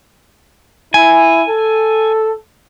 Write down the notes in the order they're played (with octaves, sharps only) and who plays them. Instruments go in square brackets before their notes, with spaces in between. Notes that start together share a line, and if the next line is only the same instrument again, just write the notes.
[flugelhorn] E4 [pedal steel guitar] G#5
[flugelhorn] A4